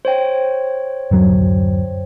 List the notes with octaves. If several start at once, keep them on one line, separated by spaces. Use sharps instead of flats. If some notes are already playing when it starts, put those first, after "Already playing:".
C5 C#5 G5
D1 F#2 F#3